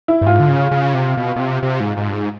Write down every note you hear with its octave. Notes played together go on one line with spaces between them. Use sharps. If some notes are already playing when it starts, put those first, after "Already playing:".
E4
G2
G#2 F4
D3
C#3
C#3
C3
B2
B2
C3
C3
G#2
G#2
G2
G#2